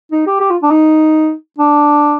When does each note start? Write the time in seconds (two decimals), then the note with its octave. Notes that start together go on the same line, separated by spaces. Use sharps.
0.12 D#4
0.27 G4
0.40 G4
0.50 F4
0.62 D4
0.71 D#4
1.58 D4